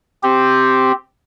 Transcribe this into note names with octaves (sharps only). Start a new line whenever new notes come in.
C4 G4